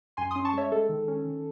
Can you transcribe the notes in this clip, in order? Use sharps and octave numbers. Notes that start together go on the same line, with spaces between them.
F#2 G#5 C6
C#4 C6 D#6
A5 C#6
G#3 C#5 E5
G#3 A4
D#3
C#4
D#3